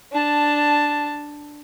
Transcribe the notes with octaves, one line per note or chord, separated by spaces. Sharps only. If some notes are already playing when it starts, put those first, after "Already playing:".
D4 A5